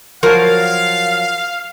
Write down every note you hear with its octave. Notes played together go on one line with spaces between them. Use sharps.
F3 F#3 A#4 F5